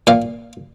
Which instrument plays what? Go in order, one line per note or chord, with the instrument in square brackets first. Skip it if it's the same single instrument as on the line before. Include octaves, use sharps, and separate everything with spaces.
[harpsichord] A#2 F5